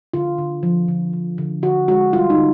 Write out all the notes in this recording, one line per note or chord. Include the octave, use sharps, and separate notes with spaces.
D3 F4
D3
F3
D3
D3
D3
D3 F#4
G#3 F#4
G3 F4
D#4
D3